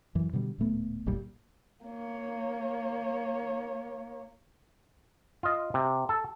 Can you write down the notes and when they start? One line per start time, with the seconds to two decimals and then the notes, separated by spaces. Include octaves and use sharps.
0.15 F#2 E3
0.33 B2 D3 G3
0.58 D1 A#2 A3 B3
1.06 F1 C2 A#2 G3
1.85 A#3 C#5
5.43 F4 D#5
5.74 C3
6.09 A4